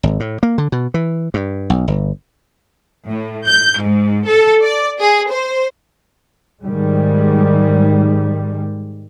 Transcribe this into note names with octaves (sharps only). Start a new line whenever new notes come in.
G#1
A2
A#3
D3
B2
E3
G2
B1
G1
A2
G6
G#2
A4
D5
G#4
C5
G#2 D#3 G3 G#3